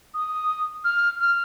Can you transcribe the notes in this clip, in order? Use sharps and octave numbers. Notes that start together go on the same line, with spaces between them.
D#6
F6
F6